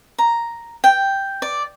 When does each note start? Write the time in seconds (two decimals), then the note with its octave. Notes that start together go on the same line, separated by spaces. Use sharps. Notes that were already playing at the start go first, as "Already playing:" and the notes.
0.18 A#5
0.84 G5
1.42 D5